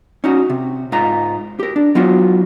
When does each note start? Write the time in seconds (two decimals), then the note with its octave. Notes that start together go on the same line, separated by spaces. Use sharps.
0.24 C#4 D#4 F#4
0.50 C3
0.92 G#2 F4 A#5
1.60 G4 A#4
1.76 D4
1.95 F#3 B3 D#4 F4 F#4